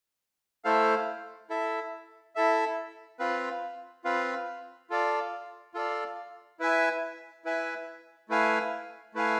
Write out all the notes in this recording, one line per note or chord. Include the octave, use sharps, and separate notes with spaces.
A3 E4 A4 C5 F5
E4 A4 E5
E4 A4 E5
C4 F4 B4 F5
C4 F4 B4 F5
F4 A4 D5 F5
F4 A4 D5 F5
E4 B4 E5 G#5
E4 B4 E5 G#5
A3 E4 B4 F5 G#5
A3 E4 B4 F5 G#5